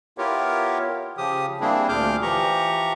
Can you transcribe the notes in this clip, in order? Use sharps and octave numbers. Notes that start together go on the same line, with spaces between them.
B3 E4 F4 G4 A#4 C#5
C#3 F3 G4 D#6
G3 A#3 C4 D4 E4 G#4
D2 A#2 G#4 D6 F6 G6
E3 F3 G4 A#5 C#6